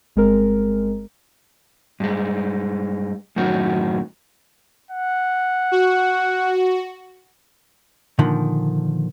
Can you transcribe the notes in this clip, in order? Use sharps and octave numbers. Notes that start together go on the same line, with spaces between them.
G1 G#3 C4 A#4
G2 G#3
F#2 A2 D#3 F#4
F#5
F#4
A#2 D3 D#3 F3